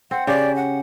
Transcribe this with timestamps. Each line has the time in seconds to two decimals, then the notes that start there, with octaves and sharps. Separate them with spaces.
0.11 C4 F#5
0.27 C#3 G4 D5
0.56 F#5